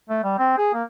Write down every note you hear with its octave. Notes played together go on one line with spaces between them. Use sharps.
A3
G3
C4
G#4
A#3